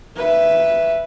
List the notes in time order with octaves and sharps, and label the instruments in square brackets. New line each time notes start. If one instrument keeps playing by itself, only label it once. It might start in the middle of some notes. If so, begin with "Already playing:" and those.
[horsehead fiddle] B4 E5